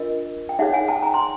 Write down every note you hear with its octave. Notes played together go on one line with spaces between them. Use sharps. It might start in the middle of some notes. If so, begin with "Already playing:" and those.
Already playing: D4 F4 A#4 D#5
G5
D#4 G#4 C#5 E5 F#5
F#5 G#5
G5 A5
G#5 A#5
A#5 C6